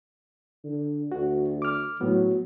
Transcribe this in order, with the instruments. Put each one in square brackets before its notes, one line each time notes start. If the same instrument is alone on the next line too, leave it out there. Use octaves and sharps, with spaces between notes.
[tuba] D3
[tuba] D2 [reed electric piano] F#4
[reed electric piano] D6 F6
[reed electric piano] A2 B3 [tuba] F#3